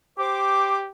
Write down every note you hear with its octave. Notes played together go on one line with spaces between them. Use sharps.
G4 C5 D6